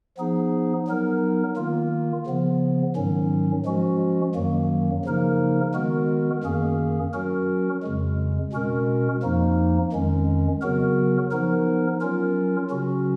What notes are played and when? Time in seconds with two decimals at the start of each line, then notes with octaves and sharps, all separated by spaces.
0.18 F3 B3 D#4 G#4
0.87 F#3 B3 D#4 A#4
1.56 D#3 A#3 F4
2.26 C#3 F3 B3
2.96 G#2 D#3 F#3 C#4
3.65 F3 G#3 C#4 F#4
4.35 F#2 D#3 F#3 A#3
5.05 C#3 F3 A#3 D#4 A#4
5.74 D#3 G#3 B3 F#4 A#4
6.44 F#2 D#3 A#3 C#4 G#4
7.13 F#3 C#4 F#4 A#4
7.83 F2 C#3 G#3
8.53 B2 G#3 C#4 F#4 A#4
9.22 F2 F3 A#3 D#4
9.92 F2 D#3 G#3 C#4
10.61 C#3 F#3 B3 F#4 A#4
11.31 F3 B3 D#4 A#4
12.00 F#3 C#4 F4 A#4
12.70 C#3 F#3 C#4 F#4